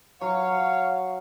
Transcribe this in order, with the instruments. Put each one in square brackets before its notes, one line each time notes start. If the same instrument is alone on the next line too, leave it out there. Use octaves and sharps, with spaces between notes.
[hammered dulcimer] F#3 [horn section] C#5 F5